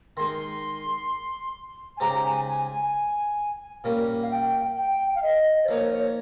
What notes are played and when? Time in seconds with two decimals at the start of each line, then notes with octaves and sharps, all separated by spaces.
0.17 D#3 G#3 D#4 C6
1.97 G#5
2.00 C#3 G#3 D#4 G4 C5 A#5
2.24 G#5
2.47 G#5
2.70 G#5
3.84 A#2 G3 A#3 C#4
4.22 F5
4.30 G5
4.77 G5
5.15 F5
5.22 D#5
5.64 C5
5.68 F3 A#3 D#4 C#5
5.91 C#5